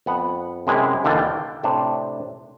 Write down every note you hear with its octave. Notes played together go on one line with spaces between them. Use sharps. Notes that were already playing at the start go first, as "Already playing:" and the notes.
F2 B3 F#5
F#2 C3 G#3 E4
D#2 D3 E3 F4 D5
G5
A2 C3 D4 C5